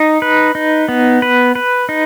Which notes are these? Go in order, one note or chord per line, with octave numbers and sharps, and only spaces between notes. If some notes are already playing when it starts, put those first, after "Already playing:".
Already playing: D#4
B4
D#4
B3
B4
B4
D#4